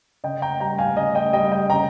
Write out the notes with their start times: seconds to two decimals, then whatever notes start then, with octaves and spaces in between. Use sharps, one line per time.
0.24 C#3 D#5 G5
0.42 G5 A#5
0.60 G3 G5 A#5
0.78 F5 G#5
0.97 C#3 D#5
1.15 D#5 G5
1.33 G3 D#5 G5
1.52 D#5 G5
1.70 C#3 G5 A#5